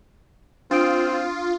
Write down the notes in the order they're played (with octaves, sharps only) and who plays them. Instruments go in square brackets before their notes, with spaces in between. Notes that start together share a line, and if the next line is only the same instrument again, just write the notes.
[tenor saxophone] C4 [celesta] D4 D#6 D7 [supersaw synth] F4